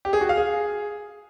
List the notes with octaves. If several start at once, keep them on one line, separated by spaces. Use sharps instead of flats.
G4
G#4
F#4
F5
G#4